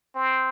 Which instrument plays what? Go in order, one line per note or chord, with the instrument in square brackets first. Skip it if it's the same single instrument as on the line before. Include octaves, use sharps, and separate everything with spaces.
[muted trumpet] C4